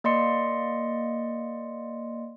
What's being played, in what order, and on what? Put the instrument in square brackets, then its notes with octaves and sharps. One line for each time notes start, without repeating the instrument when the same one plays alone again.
[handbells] A#3 D5 D#5 C6 C#7